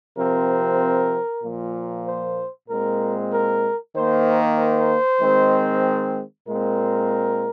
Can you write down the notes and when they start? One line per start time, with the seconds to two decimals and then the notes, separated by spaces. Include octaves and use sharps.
0.18 C3 F3 C4 A#4
1.43 A#2 F3 A#3
2.07 C5
2.69 A#2 G#3 C4 A#4
3.32 A#4
3.95 D#3 A#3 C5
4.58 C5
5.21 D#3 G#3 C4
6.48 A#2 G#3 C4 A#4